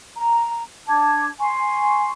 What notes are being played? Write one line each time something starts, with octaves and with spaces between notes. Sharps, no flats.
A#5
D4 A5 D6 G#6
G#5 C6 C#6